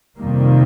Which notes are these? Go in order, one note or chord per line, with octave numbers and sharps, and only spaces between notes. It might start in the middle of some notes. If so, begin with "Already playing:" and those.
F2 C3 D#3 G3 A#3